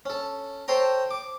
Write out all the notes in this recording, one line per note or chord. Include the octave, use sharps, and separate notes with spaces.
C#4 A4
A4 C5 C#5 G5 A#5
D6